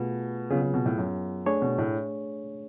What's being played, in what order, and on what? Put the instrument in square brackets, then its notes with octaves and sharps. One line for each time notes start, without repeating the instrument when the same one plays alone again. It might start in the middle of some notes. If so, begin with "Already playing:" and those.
Already playing: [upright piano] B2 [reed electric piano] A3 F4 G#4 B4
[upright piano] C#3 [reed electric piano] F#3 B3 F4 G#4
[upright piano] C#3
B2
A2
F#2
[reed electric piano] A3 D4 G#4 C#5
[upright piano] B2
A2